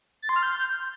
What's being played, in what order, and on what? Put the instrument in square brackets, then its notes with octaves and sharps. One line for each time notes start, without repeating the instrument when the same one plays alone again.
[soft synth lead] A6
C6
F6
G6